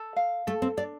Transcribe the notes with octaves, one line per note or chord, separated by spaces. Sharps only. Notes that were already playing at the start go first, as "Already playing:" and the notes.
Already playing: A4
F5
A3 A4
C4
D4 D5